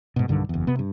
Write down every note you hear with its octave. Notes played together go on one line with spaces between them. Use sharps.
G#2 B2
B1 G2 D3 D#3
F#1 E2
C3 B3
G2